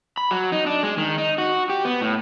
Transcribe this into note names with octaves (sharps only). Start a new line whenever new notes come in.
B5
F#3
D#4
D4
G#3
D#3
D#4
F#4
G4
B3
A2